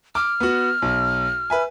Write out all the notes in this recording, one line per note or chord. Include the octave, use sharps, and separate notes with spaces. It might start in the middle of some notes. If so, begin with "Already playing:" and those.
D6 F6
B3 F#4
B1
B4 E5 G#5